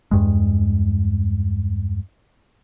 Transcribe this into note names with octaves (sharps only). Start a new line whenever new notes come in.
E2 G2 G#3